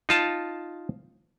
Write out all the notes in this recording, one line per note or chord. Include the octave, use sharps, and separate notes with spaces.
D#4 F4 A5